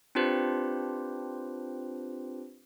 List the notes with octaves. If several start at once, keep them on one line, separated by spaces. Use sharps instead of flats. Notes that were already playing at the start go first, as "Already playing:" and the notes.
C4 D4 F4 G4 B4 C5